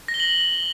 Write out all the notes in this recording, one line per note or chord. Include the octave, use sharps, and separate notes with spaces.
A#6
G7
F#7